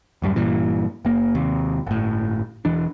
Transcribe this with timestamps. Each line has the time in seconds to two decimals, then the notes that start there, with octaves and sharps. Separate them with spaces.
0.22 D1 F#2 G3
0.36 G2 A#2 E3
1.05 F#1 A#3
1.35 D#2 C3
1.86 G1 A2
2.65 E1 E3 D4